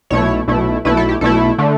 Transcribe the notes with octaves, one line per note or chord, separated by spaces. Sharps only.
B1 B2 A3 E4 C#5
B1 B2 A3 E4
B1 B2 A3 E4 B4
A4
G4
B1 B2 A3 E4 A4
D3 A3